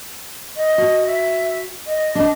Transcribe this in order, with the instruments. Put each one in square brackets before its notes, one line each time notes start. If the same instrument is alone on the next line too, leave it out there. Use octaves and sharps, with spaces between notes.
[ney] D#5
[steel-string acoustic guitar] F#4
[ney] E5
D#5
[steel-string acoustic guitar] D4 D#5 [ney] A5